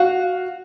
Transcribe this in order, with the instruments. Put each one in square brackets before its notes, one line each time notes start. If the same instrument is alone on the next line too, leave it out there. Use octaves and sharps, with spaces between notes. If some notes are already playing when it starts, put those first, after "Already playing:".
Already playing: [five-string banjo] F#4 [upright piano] F5